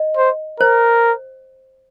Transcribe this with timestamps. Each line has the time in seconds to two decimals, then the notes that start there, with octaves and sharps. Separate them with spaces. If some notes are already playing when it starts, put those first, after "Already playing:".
Already playing: D#5
0.17 C5
0.60 A#4 C5